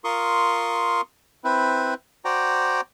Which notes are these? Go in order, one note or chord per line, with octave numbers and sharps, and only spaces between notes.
F4 A#4 C6 C#6 D#6
C4 E4 B4
F#4 C5 D5 G5 A#5